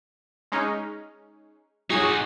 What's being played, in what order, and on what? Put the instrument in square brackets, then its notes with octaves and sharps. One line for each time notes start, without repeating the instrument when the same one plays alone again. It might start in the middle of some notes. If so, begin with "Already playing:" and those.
[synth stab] G#3 C#4 D#4
[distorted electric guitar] D#4 F#4 [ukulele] G#4 [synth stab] C#5 G#6